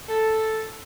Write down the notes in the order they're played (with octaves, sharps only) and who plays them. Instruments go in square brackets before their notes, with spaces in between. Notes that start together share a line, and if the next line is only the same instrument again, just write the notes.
[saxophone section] A4